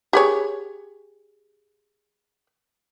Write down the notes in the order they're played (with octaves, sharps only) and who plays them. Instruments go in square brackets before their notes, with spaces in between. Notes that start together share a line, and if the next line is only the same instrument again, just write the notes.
[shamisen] G4 G#4 C#5